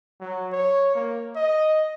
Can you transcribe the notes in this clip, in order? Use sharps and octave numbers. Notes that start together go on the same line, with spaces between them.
F#3
C#5
A#3
D#5